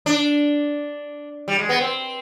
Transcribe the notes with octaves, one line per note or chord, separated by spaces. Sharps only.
D4
G3
G#3
B3
C4